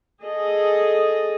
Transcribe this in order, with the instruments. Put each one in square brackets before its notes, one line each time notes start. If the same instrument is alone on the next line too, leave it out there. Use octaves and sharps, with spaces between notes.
[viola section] G#4 A4 D#5